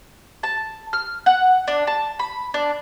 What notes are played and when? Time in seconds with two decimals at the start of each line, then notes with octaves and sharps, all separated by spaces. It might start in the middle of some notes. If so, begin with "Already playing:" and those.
0.43 A5
0.93 F6
1.26 F#5
1.68 D4
1.87 A5
2.19 B5
2.54 D4